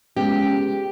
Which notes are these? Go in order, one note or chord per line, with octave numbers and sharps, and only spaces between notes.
C#2 G#3 B3 G4